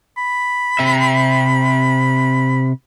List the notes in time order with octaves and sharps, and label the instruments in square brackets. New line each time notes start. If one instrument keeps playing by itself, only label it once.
[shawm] B5
[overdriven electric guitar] C3 E5